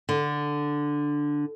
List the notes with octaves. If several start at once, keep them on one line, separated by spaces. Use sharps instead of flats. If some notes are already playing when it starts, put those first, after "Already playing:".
D3